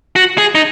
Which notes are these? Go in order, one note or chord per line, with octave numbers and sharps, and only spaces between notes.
F#4
G#4
D#4